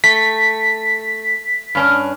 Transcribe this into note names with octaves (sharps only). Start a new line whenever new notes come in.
A3 B6
G2 C#4 D4